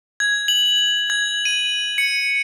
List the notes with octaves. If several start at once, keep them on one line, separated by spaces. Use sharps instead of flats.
G#6
F#7
G#6
D#7
C#7